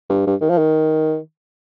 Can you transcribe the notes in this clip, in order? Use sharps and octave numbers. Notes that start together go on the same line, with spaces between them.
G2
G2
D#3
F3
D#3